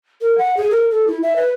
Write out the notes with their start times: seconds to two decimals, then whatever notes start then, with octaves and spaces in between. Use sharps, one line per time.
0.21 A#4
0.38 F#5
0.57 G#4
0.71 A#4
0.91 A4
1.07 E4
1.23 E5
1.36 B4